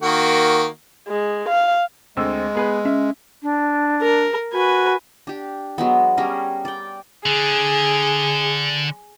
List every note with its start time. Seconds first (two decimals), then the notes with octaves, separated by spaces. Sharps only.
0.02 D#3 A#3 F#4
1.08 G#3
1.49 F5
2.17 D2 G#3 C4 E6
2.55 B3 G#4 B4
2.85 C#4 E5
3.43 D4
4.02 A#4
4.53 F#4 B4 G#5
5.27 D4 G4
5.78 F#3 G#3 B3
6.17 G3 C#4 G#4 A#4
6.65 D5 G5
7.26 D3 G#4